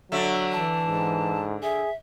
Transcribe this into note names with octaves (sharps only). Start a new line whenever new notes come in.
D3 F#3 A3
E3 A5
G#2
G#4 E5